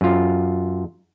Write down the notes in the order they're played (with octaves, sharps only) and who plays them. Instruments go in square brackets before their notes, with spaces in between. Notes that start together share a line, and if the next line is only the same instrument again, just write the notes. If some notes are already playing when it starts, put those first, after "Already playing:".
[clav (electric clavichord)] F#2 F4